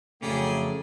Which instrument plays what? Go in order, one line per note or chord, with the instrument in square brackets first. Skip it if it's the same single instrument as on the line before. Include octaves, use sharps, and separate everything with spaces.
[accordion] F2 F#3 [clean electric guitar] C#3 [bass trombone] A3 [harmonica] G#4 D5 G5